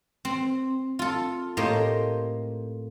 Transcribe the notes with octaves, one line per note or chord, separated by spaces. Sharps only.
C4
F4 A4
A2 A#3 G4 C5 D#5